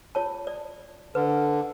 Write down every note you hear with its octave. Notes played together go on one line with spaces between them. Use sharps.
F4 C#5 A5
D5
D3 B4